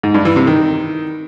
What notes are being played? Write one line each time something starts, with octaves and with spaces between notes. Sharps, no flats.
G#2
G2
E3
C3
D#3